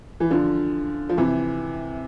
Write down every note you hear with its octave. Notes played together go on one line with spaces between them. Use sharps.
E3
D3 F3
F3
C3 E3